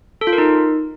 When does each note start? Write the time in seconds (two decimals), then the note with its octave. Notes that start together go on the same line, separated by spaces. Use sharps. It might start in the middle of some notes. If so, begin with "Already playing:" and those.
0.21 A4
0.27 F4
0.33 A#4
0.38 D#4